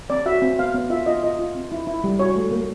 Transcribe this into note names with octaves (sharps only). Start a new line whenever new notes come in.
C4 D5
F#4 E5
C4
B3 F5
B3
F4 E5
F4 D#5
F4 D#5
F4
C4
E4
E4
G3
F#4 C#5
A3
A#3